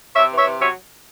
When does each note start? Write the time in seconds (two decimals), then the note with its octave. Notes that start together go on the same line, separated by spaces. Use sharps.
0.16 C3 C#5 E5
0.31 E3
0.38 C#5 E5
0.46 C3
0.60 F#3 C#5 E5